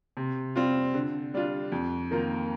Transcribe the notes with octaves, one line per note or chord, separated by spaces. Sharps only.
C3
G3 C4 F4
D3
G3 D4 F4
F2
D#3 A#3 F4 A#4